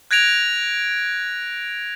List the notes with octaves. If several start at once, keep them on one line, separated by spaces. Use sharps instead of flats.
F#6 G#6 A#6 D7 F7